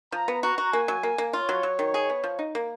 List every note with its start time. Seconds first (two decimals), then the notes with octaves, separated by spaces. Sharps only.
0.12 F3 A#5
0.28 B3
0.43 F#4 A#5
0.58 F#4
0.73 A#3 G#5
0.88 F#3
1.03 A#3
1.18 A#3
1.33 F4 C#5
1.49 F#3
1.63 F#3
1.79 D#3
1.94 G#4
2.10 B3
2.24 F3
2.39 D#4
2.55 A#3